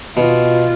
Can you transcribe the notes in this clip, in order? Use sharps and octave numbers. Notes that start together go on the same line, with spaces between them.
B2 F4